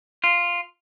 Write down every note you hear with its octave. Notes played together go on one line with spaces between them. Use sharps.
F4